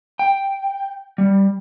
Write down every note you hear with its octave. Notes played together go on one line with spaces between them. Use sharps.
G5
G3